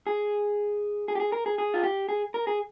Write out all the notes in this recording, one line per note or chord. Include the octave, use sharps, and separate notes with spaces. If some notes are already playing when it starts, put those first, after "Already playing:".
G#4
G#4
G4
G#4
A#4
G#4
G#4
F4
G4
G#4
A#4
G#4